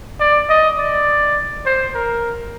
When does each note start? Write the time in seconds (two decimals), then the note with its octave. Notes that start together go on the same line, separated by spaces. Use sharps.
0.20 D5
0.49 D#5
0.78 D5
1.65 C5
1.94 A#4